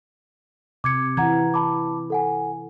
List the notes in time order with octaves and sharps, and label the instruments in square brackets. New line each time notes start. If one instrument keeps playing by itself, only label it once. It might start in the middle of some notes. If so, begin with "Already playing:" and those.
[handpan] C3 [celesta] D6 G#6 C#7
[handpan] E3 [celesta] F#5 A#5 G#6
[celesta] A5 B5 D6
A4 F#5 G#5